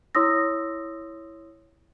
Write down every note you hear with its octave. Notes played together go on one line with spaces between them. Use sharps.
E4 C#5 C6 D#6 E6 A#6